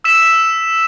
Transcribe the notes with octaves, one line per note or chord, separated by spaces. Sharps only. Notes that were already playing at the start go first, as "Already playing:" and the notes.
E6 B6 E7